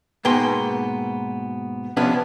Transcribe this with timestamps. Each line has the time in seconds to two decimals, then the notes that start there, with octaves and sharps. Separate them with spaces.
0.25 G#2 B2 A#3 B3 G5 C6
1.97 C3 F3 B3 C#4 D4